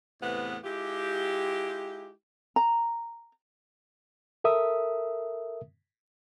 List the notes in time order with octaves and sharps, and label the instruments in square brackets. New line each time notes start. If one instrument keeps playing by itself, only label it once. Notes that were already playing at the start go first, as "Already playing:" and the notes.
[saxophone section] E2 A2 C3 B3 B4 F#5
G#3 E4 F4 G4
[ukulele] A#5
[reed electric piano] A4 A#4 E5 D#6